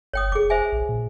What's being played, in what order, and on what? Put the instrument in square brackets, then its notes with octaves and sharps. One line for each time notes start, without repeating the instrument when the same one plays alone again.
[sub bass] G1 [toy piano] C#5 G5 D#6
[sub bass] F1 [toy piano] G#4 D6
[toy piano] C5 E5 G#5
[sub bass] A#1
A#2